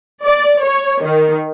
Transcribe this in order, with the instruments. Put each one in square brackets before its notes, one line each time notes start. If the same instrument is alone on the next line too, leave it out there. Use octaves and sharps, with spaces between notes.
[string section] D5
C#5
D#3